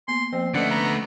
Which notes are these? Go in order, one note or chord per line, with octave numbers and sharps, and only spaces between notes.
A#3 B3 C6
F3 A#3 C4 C5
D3 A3 C#4 B4 D5 D#5 F#5
B3 A#5